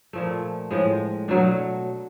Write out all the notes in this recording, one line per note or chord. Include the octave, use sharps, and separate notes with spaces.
A#2 F3 A3
A2 F3 G#3
B2 F#3 A3 D4